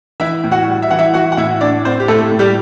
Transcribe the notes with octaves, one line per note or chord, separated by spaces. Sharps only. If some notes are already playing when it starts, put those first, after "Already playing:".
E3 E4 E5
A2
F#4 F#5
G3
E5
E3 F#5
E4 E5
E3 F#4 F#5
F#5
A2 E4 E5
A2 D4 D5
A2 C4 C5
G4
A2 A3 A4
A2
G3 G4